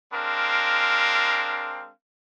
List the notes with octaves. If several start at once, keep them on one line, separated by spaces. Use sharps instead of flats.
G#3 C4 D4 A#4 F5